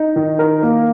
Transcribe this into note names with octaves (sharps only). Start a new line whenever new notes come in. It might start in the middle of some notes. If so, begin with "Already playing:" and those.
Already playing: D#4
D#3
A#4
A#3